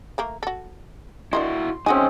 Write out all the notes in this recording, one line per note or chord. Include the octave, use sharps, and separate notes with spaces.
A3 A#3 A#4
F#4 A4
D4 E4 F#4 A#4 D#5 C6
G#3 A3 C4 C#4 D#4 F#4 G#5